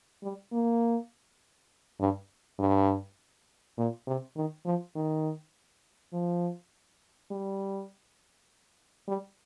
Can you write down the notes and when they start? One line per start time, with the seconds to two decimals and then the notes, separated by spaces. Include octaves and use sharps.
0.23 G3
0.53 A#3
2.00 G2
2.59 G2
3.78 A#2
4.07 C3
4.36 D#3
4.65 F3
4.95 D#3
6.13 F3
7.31 G3
9.08 G3